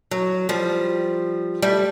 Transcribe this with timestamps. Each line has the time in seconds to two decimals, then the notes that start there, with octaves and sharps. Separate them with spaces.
0.11 F#3
0.49 F3 G3
1.62 G3 A3